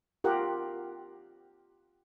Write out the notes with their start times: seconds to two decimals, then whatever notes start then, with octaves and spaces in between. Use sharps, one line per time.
0.24 F4 G4 A#4 F#5